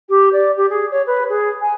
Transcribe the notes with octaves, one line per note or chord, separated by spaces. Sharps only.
G4
D5
G4
G#4
C#5
B4
G#4
G#5